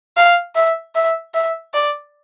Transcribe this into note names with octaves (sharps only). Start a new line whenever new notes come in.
F5
E5
E5
E5
D5